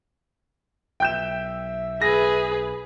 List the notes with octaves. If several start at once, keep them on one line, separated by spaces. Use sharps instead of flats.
B1 E5 G5 G6 E7
G#4 B4 A#6